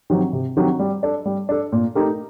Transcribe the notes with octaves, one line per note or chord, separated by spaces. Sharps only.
D#3 F#3 C4 G4
C3
D#3 F#3 C4 G4
G3
D4 A4
G3
D4 A4
A#2
A3 D#4 G4 A#4